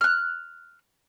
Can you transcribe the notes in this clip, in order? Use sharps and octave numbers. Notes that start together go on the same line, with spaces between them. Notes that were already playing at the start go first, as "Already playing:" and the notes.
F6 F#6